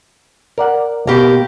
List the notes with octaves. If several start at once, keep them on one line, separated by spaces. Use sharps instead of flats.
A#4 D5 F#5
B2 A#3 G4